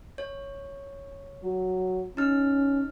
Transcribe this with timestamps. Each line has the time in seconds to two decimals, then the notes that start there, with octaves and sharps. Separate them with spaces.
0.18 C#5
1.43 F#3
2.17 C#4 D#4 F6